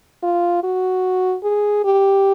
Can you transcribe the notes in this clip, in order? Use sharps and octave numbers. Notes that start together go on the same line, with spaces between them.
F4
F#4
G#4
G4